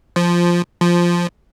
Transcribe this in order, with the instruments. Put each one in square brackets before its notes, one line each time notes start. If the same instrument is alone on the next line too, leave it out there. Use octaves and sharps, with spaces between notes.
[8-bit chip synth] F3
F3